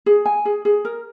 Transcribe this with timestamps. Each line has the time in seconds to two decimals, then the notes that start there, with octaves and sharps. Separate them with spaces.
0.06 G#4
0.25 G#5
0.45 G#4
0.65 G#4
0.85 A#4